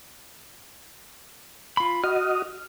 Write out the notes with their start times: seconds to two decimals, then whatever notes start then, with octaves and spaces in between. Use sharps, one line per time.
1.77 F4 B5
2.04 F#4 D#5 F6